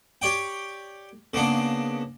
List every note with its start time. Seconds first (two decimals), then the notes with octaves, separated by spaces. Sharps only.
0.22 G4 C#5 D5 G5
1.34 C#3 A#3 B3 D4